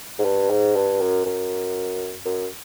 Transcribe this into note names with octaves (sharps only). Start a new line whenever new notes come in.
G#2
G2
G#2
G2
F#2
F#2
F#2